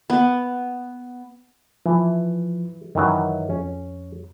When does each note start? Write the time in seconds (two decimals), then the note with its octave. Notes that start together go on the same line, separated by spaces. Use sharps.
0.10 B3
1.86 E3 F3
2.95 F#2 D#3 E3 F#3
3.50 F2 C#4